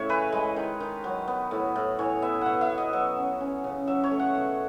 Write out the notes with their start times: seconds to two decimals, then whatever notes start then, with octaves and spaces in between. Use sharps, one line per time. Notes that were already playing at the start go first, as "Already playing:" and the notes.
Already playing: A2 C#3 A3 C#5 E5
0.09 E3 B4
0.32 G#3
0.56 D#3
0.80 D#3
1.04 F#3
1.28 B3
1.51 A2
1.75 A2
1.99 E3 C#5
2.22 B3 E5
2.41 B2 E5 F#5
2.61 E5
2.69 B2
2.78 D#5
2.93 F#3 E5
3.17 C#4
3.41 C#4
3.64 C#3
3.87 F#3 E5
4.04 C#5
4.11 A3
4.19 F#5
4.35 B2